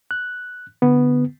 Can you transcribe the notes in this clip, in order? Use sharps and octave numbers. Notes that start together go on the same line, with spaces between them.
F#6
D3 B3